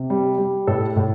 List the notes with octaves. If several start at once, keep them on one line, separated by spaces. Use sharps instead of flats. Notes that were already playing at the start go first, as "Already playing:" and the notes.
Already playing: C3
G3
G3
A2 A4
A2